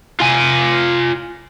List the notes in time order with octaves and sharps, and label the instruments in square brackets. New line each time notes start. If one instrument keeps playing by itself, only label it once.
[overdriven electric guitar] F4 G#5